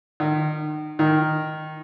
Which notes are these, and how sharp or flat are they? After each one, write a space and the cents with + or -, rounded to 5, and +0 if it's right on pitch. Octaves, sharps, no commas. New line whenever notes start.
D#3 -30
D#3 +0